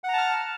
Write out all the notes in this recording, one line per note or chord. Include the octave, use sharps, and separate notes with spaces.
F#5 A5 A#5 F6